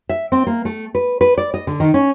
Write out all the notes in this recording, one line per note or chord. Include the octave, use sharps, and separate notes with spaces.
E5
C4
A#3
A3
B4
B4
D5
D#5
D3
D#3
C#4